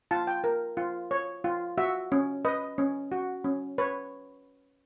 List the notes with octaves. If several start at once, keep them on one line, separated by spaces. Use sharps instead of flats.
F4 A5
G5
A#4
F4
C#5
F4
F#4 E5
C#4
B4 D#5
C#4
F#4
C#4
B4 C#5